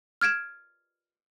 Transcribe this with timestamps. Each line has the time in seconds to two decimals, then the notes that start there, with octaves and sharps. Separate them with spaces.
0.21 F6 G#6 D7 E7